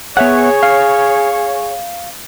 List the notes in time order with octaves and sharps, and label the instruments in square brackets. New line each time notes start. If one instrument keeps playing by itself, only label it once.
[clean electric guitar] B3 E5 F#5 [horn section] G#4 C#5
[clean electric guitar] F5